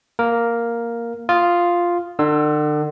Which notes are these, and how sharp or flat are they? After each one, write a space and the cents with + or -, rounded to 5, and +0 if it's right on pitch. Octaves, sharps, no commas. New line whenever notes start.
A#3 +0 A#4 +0
F4 +0 D#6 +0
D3 +40 E6 +5